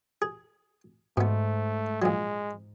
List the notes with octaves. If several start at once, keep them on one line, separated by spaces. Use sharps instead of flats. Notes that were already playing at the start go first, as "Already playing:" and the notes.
G#4
G#2 B2 A3 B3
A#1 F#3 G#3